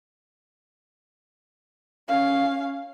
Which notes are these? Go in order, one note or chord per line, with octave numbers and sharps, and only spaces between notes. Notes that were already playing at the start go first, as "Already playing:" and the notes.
C#4 F5